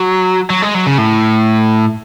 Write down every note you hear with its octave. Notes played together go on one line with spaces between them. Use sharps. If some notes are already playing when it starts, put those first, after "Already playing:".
Already playing: F#3
F#3
G#3
F#3
C#3
A2